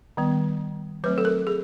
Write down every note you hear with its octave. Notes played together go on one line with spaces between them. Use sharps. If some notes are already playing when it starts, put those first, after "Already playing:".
D#3 G3 B3
F#3 A3 C4 B4
A4
A#4
G#4